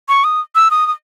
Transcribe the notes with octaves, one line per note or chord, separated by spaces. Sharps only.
C#6
D#6
E6
D#6
D#6